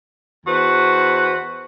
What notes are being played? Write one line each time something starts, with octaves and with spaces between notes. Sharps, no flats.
E2 F#4 B4 C5